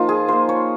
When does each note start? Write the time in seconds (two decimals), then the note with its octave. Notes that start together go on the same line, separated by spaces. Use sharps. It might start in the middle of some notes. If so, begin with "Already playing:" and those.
Already playing: F3 A#3 D#4 F4
0.09 G#4
0.28 A#3 F4 C5
0.49 C#5